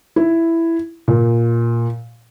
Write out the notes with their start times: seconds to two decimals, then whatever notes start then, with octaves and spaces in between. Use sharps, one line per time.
0.16 E4
1.08 A#2